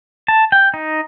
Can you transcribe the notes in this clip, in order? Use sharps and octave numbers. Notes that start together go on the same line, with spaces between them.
A5
G5
D#4